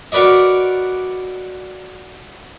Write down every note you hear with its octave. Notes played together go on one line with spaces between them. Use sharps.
F#4 A#4 B4 D5 D#5